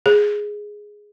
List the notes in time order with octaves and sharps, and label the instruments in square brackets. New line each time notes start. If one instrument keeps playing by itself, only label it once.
[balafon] G#4